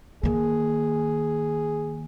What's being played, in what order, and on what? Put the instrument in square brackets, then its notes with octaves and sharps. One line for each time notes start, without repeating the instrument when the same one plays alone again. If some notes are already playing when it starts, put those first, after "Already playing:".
[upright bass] D#3 A#3 [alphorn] G#4